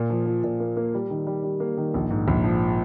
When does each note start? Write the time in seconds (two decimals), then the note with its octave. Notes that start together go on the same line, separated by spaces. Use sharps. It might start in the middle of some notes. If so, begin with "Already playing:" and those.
Already playing: A#2
0.10 F3
0.26 F3
0.44 A#2
0.60 A#3
0.77 A#3
0.94 G3
1.10 D#3
1.27 G3
1.44 G3
1.60 A#3
1.77 D#3
1.94 A#1
2.11 G#2
2.28 A#1
2.44 F3